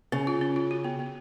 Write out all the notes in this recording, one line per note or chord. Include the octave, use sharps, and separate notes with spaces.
C#3 C#4
F4
C#4
F4
F#4
B3
B3